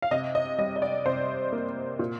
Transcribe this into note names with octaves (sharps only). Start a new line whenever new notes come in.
F5
C3 D#5
D#5
G3 D#5
D#5
D5
C3 C5
A#3
A#2